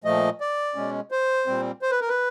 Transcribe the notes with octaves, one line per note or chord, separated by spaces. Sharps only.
A#2 F3 A3 D#5
D5
B2 G#3 C#4
C5
A#2 G3 C4
C5
B4
A#4
B4